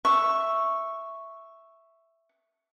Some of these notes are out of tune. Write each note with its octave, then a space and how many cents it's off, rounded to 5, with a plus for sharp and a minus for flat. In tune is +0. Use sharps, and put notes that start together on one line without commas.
E5 +5 C#6 +0